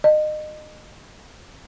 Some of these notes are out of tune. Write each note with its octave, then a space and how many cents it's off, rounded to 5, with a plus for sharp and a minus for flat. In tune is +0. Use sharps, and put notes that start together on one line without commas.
D#5 -30